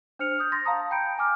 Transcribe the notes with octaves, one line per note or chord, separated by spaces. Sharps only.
D4 C5 F6 C#7 F7
D#6 G6
C6 A6 A#6
F5 A5 A#5 D#6
G5 A#5 B5 G6 C#7 D7
G#5 A#5 D6 F6